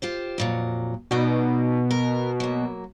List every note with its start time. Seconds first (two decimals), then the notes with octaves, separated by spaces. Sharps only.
0.02 F4 G4 C5
0.38 F2 A#2 F#3
1.11 B2 D#4 D5
1.91 A#4
2.40 F#3 A#3